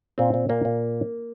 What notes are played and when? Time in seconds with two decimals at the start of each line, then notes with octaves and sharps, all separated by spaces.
0.18 A#2 C4
0.34 A#2
0.49 A#2 A#3
0.65 A#2